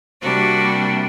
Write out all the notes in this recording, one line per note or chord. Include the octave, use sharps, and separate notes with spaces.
C3 G3 A#3 D4 F#4